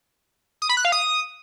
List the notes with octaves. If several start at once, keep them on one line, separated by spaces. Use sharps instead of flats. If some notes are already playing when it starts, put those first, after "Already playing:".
D#6
B5
F#6
F5
D#6